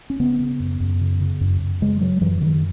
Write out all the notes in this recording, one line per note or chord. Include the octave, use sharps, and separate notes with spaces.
C#4
C#3 B3
C#3
F#2
F#2
C#3
C#3
F#2
F#2
C#3 G#3
C#3 F#3
F#2 E3
F#2 D#3